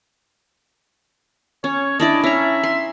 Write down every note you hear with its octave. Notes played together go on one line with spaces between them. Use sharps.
C#4 C#5
D4 E4 D5 D#5
C#4 E5 A#5
C6